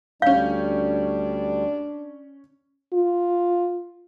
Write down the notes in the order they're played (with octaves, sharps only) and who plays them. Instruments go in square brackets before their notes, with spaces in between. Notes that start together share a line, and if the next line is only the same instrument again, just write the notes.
[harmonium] D2 G3 [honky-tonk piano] C#4 G6 [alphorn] D4 [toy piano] F5
[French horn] F4